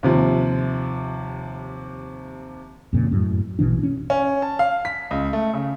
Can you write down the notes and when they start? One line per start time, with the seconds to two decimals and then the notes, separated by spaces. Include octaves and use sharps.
0.03 D#2 C3 F3
2.93 F2 A#2 C#3
3.11 F#2 A2
3.59 A#1 B2 E3 D4
3.83 C#4
4.10 C#4
4.42 A5
4.59 F5
4.85 B6
5.11 C#2
5.33 A3
5.54 C#3